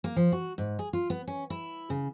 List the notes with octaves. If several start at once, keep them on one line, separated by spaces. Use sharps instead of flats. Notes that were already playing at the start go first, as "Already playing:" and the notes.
A#3
F3
F#4
G#2
G#4
F4
B3
C#4
E4
C#3